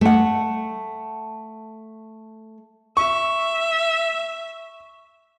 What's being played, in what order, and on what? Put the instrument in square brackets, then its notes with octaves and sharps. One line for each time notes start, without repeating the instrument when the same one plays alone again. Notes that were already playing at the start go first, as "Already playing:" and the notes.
[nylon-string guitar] A3 F#5
[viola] E5 [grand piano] C#6